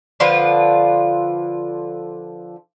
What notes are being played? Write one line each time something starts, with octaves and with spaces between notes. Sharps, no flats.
D3 F3 F4 B4